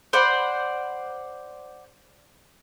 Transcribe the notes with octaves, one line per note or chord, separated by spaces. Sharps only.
C5 D5 F#5 B5